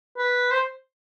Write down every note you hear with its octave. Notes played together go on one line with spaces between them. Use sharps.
B4
C5